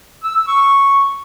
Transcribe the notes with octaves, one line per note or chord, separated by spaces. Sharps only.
E6
E6
C#6